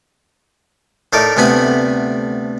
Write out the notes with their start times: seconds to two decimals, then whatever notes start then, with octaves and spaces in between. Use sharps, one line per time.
1.13 A2 A3 D#4 A#4 D5
1.37 D2 C3 A3 B3 G#5 B5